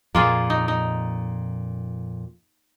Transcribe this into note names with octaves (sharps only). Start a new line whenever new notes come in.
F2 A#2 A#3 F4 G#4
D#4
D#4